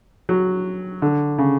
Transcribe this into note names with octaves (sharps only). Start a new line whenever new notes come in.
F#3
D3
C#3